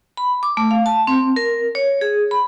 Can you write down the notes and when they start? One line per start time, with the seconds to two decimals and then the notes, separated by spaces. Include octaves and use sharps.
0.17 B5
0.43 D6
0.57 A3
0.71 F5
0.86 A5
1.07 C4
1.36 A#4
1.75 C#5
2.01 G#4
2.31 B5